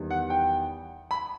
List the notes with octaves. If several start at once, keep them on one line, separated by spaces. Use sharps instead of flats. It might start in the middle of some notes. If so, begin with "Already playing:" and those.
Already playing: E2 D#3 G3
F#5
G5
B5